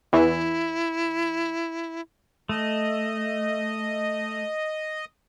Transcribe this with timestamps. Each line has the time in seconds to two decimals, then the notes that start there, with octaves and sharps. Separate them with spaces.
0.13 E2 E3 E4
2.49 A3 D#5